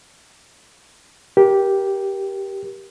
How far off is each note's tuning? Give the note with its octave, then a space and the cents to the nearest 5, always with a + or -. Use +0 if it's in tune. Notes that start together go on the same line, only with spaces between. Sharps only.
G4 -5 A#4 +25